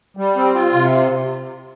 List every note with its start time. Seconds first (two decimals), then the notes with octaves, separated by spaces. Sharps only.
0.17 G3
0.36 C4
0.55 F4
0.74 C3